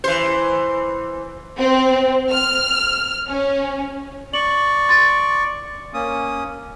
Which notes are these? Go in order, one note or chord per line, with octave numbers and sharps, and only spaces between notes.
E3 C5
C4
F6
C#4
D5 C#6 F#7
C6 A6
A#3 C#4 D#6